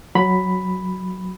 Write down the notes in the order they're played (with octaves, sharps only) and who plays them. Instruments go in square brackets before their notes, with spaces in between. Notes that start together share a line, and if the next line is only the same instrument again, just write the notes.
[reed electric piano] F#3 B5